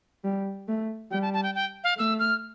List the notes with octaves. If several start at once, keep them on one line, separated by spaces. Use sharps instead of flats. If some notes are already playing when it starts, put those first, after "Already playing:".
G3
A3
G3 G5
A5
A5
G5
G5
F5
A3 E6
F6